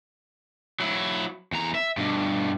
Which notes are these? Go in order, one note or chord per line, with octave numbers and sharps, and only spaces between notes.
F#3 E4
E2 A#5
E5
G2 B2